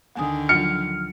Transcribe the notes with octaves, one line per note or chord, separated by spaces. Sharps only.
D2 D3 D#3 G#5 D#6
F3 F#3 F4 F6 C#7